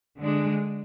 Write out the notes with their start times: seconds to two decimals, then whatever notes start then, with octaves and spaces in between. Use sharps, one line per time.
0.19 D3 G#3 D4